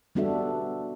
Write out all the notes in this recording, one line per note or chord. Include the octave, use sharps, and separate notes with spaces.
G3 B3 D4 F#4 A4 E5